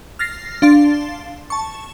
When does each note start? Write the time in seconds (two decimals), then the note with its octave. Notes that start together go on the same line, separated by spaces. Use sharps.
0.19 F6 A6 A#6 C7
0.62 D4 F5 C6 A6
1.50 A5 C#6